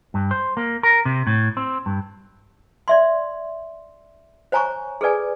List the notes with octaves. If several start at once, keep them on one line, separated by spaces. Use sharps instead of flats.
G2
C5
A#3
A#4
C3
A2
C4
G2
D5 E5 C6
C5 C#5 G#5 A#5 C#6
G#4 A4 B4 D5 G#5